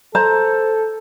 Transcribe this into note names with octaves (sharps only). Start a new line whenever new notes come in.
A4 C5 A#5